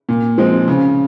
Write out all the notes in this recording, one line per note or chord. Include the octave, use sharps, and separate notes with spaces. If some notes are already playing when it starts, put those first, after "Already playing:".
A#2
F3 G#3 C4
C#3